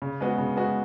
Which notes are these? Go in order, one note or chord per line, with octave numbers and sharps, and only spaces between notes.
C#3
G#3 B3 F#4
C#3
G#3 B3 F#4